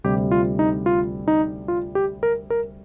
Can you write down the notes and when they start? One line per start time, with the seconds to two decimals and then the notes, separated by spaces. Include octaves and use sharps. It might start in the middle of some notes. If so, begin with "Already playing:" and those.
0.04 D2 C3 G3 G4
0.31 F4
0.59 D#4
0.86 F4
1.28 D#4
1.68 F4
1.95 G4
2.23 A#4
2.50 A#4